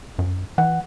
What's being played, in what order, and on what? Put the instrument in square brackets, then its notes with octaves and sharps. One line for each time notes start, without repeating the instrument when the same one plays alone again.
[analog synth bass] F#2
[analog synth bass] E3 [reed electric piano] F#5